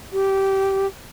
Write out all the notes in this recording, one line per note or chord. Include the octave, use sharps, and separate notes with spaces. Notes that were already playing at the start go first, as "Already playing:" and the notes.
G4